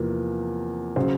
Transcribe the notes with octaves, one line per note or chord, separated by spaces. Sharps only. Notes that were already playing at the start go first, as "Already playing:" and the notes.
Already playing: E2 C3 F3 A#3
C#3 F#3 C5